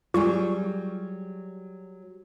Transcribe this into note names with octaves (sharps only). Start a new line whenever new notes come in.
F#3 G3 F4 G#4 C#6